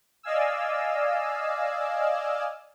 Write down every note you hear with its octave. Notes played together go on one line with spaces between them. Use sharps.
D5 D#5 F5 G#5 E6